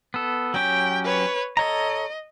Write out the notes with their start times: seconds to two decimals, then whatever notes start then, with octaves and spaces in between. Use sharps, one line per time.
0.14 B3 A4
0.54 F#3 C#4 G4 G5
1.04 B4 C#5
1.57 A4 C#5 D#5 A#5